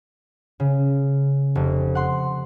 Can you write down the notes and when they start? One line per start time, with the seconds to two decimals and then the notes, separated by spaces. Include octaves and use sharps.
0.60 C#3
1.55 F1
1.95 F#5 C6